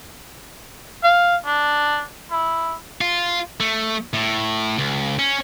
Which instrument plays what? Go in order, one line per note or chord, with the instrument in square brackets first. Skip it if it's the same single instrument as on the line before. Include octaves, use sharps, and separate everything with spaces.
[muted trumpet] F5
D4
E4
[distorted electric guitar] F4
A3
A2
C#2
C#4